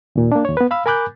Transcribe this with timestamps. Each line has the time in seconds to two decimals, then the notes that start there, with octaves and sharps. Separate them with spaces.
0.16 D#2 A#2
0.32 A#3 D4
0.45 D#2 C#5
0.57 B3 B4
0.71 F5 B5 E6
0.86 A#4 G#5 B5 D6 F#6 G6